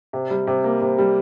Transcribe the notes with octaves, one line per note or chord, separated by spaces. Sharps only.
C3
G3
C3
A#3
C3
G3